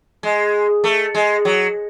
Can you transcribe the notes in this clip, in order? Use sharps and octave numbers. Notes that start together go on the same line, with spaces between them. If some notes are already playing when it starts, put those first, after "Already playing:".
G#3
A3
G#3
F#3